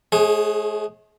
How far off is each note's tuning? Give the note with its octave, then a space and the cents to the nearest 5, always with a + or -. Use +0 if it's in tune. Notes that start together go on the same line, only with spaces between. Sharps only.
G#3 +45 G#4 +0 C#5 -35